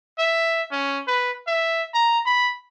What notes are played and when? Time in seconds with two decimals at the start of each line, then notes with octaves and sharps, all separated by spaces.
0.19 E5
0.72 C#4
1.08 B4
1.47 E5
1.94 A#5
2.26 B5